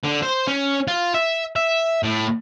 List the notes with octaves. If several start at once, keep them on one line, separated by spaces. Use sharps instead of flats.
D3
C5
C#4
F4
E5
E5
A2